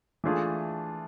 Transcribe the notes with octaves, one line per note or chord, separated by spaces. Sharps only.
E3 A3 D4 F4 G#4